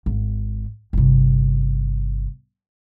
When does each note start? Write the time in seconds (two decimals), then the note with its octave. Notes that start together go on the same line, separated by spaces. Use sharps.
0.06 G#1
0.93 G1 C3